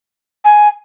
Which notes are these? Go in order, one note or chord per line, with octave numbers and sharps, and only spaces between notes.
G#5